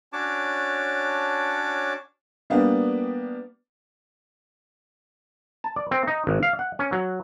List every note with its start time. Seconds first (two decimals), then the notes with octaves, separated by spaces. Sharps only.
0.13 C#4 D4 F#4 C#5 A5 D6
2.50 G3 A#3 B3 D4
5.64 A5
5.76 D5
5.91 C4
6.07 D#4
6.27 G#1
6.43 F5
6.59 F#5
6.79 C#4
6.92 F#3